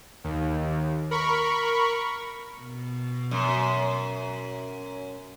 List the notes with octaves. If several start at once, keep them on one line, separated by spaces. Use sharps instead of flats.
D#2
A#4 B5 C#6
B2
F#2